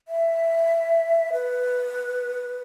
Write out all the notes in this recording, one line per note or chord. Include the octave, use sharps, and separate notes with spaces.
E5
B4